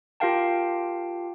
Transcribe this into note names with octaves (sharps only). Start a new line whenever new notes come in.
F4 G4 A#4 F5 G5 A5